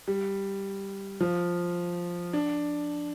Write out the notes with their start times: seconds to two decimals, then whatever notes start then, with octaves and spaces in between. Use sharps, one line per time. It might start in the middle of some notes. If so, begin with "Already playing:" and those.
0.08 G3
1.21 F3
2.33 D4